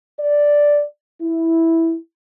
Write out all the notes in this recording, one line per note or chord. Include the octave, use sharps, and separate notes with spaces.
D5
E4